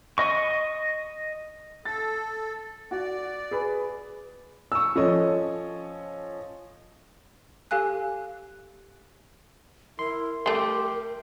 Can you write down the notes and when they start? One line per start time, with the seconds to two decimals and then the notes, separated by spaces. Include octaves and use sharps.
0.18 D#5 C#6
1.85 A4 A6
2.91 F#4 D5
3.51 G#4 B4
4.72 C#6 E6
4.95 F3 C#4 A4 C#5 D#5
7.71 G4 A4 F5 G#5 F#6
9.99 E4 A#4 C6
10.46 G3 A3 G4 C6 D6